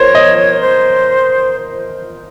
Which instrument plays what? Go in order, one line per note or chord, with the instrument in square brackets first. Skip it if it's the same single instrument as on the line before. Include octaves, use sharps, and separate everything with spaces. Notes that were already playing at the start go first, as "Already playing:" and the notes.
Already playing: [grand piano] A#4 C5 [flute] C#5
[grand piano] D#5
[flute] C5